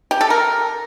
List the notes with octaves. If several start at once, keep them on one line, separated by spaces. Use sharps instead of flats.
G4
A4
A#4